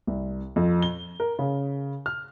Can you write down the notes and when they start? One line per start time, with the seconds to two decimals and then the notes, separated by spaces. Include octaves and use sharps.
0.07 C2
0.56 F2
0.82 G7
1.20 A#4
1.39 C#3
2.06 F6